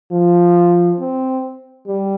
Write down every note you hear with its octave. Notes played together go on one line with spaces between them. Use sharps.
F3
C4
G3